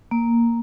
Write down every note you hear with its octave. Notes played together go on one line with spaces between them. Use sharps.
A#3